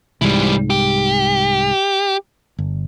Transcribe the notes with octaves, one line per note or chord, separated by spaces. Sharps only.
C2 G#2 E3 G3
G4
G1